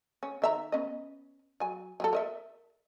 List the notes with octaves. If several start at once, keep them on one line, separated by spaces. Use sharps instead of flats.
C#4
D#3 E5 A#5
B3 C#4 D#5
F#3 G#5
F#3 G#4 A4
A#4 D#5 E5